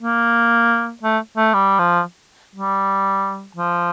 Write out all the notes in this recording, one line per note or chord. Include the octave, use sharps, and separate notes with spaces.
A#3
A3
A3
G3
F3
G3
F3